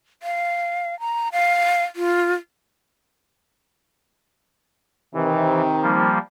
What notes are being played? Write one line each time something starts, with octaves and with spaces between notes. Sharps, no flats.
F5
A#5
F5
F4
C3 D#3 E3
F3 G3 A#3